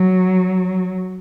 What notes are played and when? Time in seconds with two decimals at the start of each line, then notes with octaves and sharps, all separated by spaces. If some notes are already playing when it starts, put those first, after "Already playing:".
Already playing: F#3